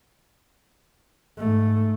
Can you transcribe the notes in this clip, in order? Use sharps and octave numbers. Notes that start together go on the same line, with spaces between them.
G#2 A3